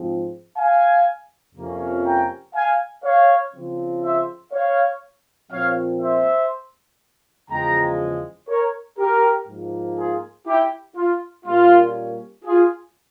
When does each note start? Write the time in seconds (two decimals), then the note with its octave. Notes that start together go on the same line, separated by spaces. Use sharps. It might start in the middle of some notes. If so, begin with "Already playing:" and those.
Already playing: G#2 F3 C4
0.56 F5 G#5
1.56 F2 C3 F3 A#3 C#4
2.05 G5 A#5
2.54 F5 G#5
3.04 C#5 F5
3.54 C#3 F3 C4
4.03 C5 E5
4.52 C#5 F5
5.51 A#2 F3 C4 C#5 F5
6.01 C5 E5
7.49 E2 C#3 F3 G#3 G5 A#5
8.48 A#4 C#5
8.98 G4 A#4
9.47 G#2 F3 A#3
9.97 F4 G#4
10.46 E4 G4
10.96 F4
11.45 A#2 G3 A#3 C#4 F4
12.44 F4 G#4